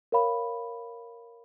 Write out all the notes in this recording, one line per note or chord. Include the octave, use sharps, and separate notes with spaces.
A#4 C#5 F5 B5